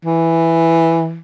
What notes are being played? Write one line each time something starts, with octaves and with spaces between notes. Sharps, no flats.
E3